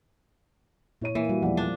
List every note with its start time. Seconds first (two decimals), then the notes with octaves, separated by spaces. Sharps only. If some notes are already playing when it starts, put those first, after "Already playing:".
1.02 A#2 E4 C#5 D#7
1.15 E3 A#3
1.29 G3 F#4
1.42 E1 F3 D5 F#5
1.57 D4